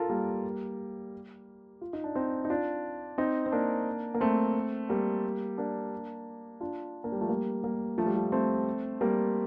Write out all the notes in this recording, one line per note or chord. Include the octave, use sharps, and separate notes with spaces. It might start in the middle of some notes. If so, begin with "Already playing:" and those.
Already playing: F4 A4 A#4
G3 A#3
F4
D#4
D4
C4 D#4
D#4
D4 F4
C4 D#4
C4
A#3 D4
A#3
A3 C4
G3 A#3
A#3 D4
D4 F4
A#3 D4
G3
F3 A3
G3 A#3
G3 A#3
F3 A3
G3
F3
A3 C4
G3 A#3